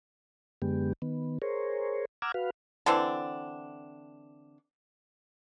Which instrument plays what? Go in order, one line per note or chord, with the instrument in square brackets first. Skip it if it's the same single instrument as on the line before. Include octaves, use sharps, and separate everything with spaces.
[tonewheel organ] F#2 D3 G#3 B3 G4
D#3 B3
G#4 A#4 C5 C#5
F#5 A#5 D6 E6 F6 G#6
F#4 B4 F5
[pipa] D3 E3 C4 D4